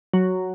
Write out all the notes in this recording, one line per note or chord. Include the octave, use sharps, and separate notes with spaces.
F#3